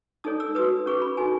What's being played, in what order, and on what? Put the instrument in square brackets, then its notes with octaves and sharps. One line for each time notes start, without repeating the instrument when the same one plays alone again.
[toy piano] D#4 A4 C#5 D#6
E6
F#4 B4 D#6
C#4 G#4 B4 C#6
B5
D#4 F#4 A4 G#5